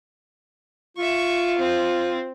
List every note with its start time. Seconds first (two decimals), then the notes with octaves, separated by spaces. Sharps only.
0.97 F4 E5 C#6
1.58 C4